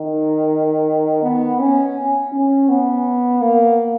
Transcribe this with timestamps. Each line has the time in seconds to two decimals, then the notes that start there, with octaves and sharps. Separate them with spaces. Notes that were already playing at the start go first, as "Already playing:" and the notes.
Already playing: D#3
1.23 B3
1.60 C#4
2.32 C#4
2.69 B3
3.42 A#3